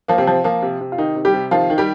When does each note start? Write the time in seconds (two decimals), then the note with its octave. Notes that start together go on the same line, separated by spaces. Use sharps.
0.08 F3 A#3
0.18 C3 C4
0.27 F3
0.44 F3 A#3
0.62 C3
0.81 C3
0.92 F4
0.98 D#3 D#4
1.16 C3
1.25 G3 G4
1.34 C3
1.51 D#3 F3 F4
1.70 D#3
1.78 G3 G4